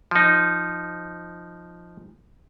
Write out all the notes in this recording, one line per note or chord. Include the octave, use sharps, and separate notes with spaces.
F3 D#4